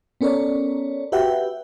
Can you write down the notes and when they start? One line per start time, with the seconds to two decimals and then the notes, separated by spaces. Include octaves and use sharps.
0.21 B3 C#4 A4 A#4 C#5 D5
1.12 F#4 G4 B4 E5 F#5 G5